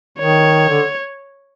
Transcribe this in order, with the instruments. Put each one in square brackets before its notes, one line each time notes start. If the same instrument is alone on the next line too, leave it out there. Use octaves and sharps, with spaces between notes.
[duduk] D#3 [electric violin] C#5
[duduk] D3